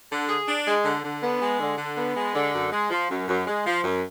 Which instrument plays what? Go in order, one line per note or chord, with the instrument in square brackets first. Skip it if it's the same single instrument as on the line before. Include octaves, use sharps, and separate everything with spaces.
[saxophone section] D3
G#4
D4
G#3
D3
D3
B3
G#3
D3
D3
B3
G#3
D3
F#2
G#3
F3
F#2
F#2
G#3
F3
F#2